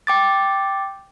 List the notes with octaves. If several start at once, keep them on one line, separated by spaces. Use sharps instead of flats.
G5 D6 A6